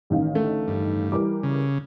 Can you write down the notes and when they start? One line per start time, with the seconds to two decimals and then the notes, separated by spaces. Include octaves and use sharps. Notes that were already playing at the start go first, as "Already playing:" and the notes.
0.10 A1 D#3 F5
0.34 D3 A3
0.68 G2
1.12 E3 G3 A#4 D6
1.43 C#3